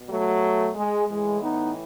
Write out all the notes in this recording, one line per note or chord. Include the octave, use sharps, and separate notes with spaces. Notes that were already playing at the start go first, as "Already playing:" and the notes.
Already playing: B2
F#3 A3
G#3
A2 E3 G#3
B3 D#4